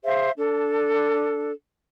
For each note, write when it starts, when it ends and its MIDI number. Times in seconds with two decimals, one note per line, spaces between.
0.05 0.30 68
0.05 0.30 72
0.05 0.30 76
0.05 0.30 77
0.37 1.53 62
0.37 1.53 69